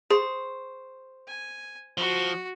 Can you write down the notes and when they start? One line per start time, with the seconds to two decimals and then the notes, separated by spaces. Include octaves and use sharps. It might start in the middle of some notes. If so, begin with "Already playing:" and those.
0.10 G#4 C5 C#6
1.28 G#5
1.97 F3 F#4